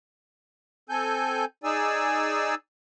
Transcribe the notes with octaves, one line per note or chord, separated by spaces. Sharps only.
C4 A4 G#5 G6
D#4 G#4 D5 G#5 E6